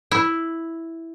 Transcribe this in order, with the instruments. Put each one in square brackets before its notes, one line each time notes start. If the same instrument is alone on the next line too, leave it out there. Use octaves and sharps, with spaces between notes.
[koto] E4